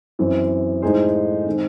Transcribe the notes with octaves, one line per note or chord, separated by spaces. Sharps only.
F#2 E3 C4
A2 G#3 D#4 G#4 C5
D#3 G#3 C4